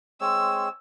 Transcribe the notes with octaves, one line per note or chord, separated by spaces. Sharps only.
G#3 C4 C#5 E6